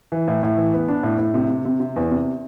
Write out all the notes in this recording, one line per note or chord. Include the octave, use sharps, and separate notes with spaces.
E3
A2
A2
E3
B3
D4
A2
A2
C3
C3
C3
C3
E2
C3